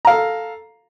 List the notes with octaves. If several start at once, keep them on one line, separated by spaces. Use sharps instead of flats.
A4 F5 A#5